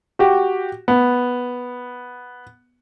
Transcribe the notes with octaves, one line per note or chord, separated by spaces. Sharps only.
F#4 G4
B3